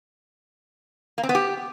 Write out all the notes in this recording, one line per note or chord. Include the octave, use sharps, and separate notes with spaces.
A#3
C4
B3
G4